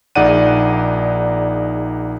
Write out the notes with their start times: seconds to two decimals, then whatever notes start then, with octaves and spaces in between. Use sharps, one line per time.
0.15 A#1 D#4 G#4 D5 F#5 D#7